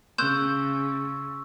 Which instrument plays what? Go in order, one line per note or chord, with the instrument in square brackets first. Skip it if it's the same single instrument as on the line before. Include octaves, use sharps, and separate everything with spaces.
[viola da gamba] C#3 [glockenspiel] C6 C#6 E6 [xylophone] F#6 G6 E7